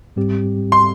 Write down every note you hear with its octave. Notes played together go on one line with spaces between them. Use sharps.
G#2 G3 C4 G4
C6